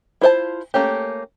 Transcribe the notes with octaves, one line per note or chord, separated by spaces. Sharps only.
E4 F4 C5 E5 A5
A3 A#3 C#4 G4